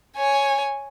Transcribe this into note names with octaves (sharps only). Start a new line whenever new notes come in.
C#5 G#5